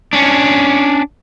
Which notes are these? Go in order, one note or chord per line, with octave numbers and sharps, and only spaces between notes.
C#4 D4